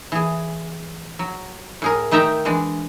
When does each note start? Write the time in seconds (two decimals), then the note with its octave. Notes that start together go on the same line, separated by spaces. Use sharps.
0.12 E3 G#4
1.19 F#3
1.82 A2 G#4 A#4
2.11 D#3 A3 D#4 E5 G5 A#5
2.45 E3 G#3 D4